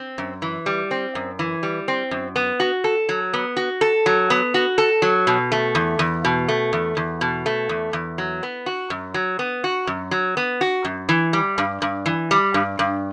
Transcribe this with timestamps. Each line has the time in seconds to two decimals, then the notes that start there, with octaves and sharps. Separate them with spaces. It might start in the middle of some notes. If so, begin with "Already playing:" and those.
Already playing: C4
0.18 F#2
0.42 E3
0.66 G3
0.91 C4
1.15 F#2
1.39 E3
1.63 G3
1.88 C4
2.11 F#2
2.36 B3
2.60 F#4
2.84 A4
3.09 F#3
3.34 B3
3.57 F#4
3.81 A4
4.06 F#3
4.30 B3
4.54 F#4
4.78 A4
5.02 F#3
5.27 B2
5.52 A3
5.75 E2
5.99 E2
6.25 B2
6.48 A3
6.73 E2
6.97 E2
7.21 B2
7.46 A3
7.69 E2
7.93 E2
8.18 F#3
8.43 B3
8.66 F#4
8.90 F#2
9.14 F#3
9.39 B3
9.64 F#4
9.87 F#2
10.11 F#3
10.37 B3
10.61 F#4
10.85 F#2
11.09 E3
11.33 G3
11.58 G2
11.82 G2
12.06 E3
12.31 G3
12.54 G2
12.79 G2